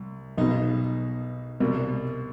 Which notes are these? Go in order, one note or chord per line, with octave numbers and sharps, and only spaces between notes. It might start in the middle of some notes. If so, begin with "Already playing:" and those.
Already playing: C2
B1 B2 D#4
C2 B2